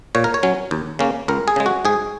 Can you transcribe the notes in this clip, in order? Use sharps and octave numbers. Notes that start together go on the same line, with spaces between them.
A#2 C#5
A#4
C#5
F#3 C#4
D#2
C#3 A#3 C#4
C#2 A#4
G#4
C#3 G#3
F#4
G#2 G#4